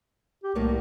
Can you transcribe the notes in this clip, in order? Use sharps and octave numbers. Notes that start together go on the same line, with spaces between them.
G4
C2 A2 A#3 C#5